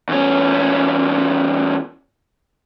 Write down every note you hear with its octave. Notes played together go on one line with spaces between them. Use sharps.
E2 C#4